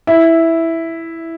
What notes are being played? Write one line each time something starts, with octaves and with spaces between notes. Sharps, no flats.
E4